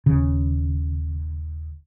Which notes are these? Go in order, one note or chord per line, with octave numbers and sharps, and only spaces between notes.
D#1 C#3